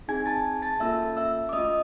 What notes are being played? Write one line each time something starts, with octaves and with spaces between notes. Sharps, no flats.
C4 D#4 G#4 G#5 G#6
A5 A6
A5 A6
A#3 C#4 F4 A4 E5 E6
E5 E6
D6
A3 C#4 F4 D#5 D#6